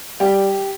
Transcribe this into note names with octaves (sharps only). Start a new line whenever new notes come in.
G3 G4